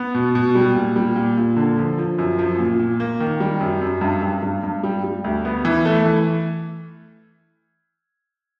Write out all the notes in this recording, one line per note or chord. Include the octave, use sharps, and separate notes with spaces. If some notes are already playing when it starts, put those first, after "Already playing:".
Already playing: B3
B2
B2
G3
A#2
G3
A#2
A#2
D3
F3
F3
F#2
F3
A#2
A#2
A#3
D#3
G3
F#2
F#2
G2
G2
G2
G2
G3
G3
D2
B3
E3
A3
E3